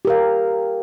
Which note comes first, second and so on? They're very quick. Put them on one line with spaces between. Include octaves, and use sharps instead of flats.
G4 A#4 F5